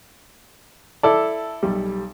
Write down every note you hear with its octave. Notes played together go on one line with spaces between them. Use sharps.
E4 A4 D5 A5
B1 G3